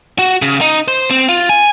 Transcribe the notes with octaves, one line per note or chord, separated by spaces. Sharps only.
F#4
C#3
D#4
C5
C4
F4
G#5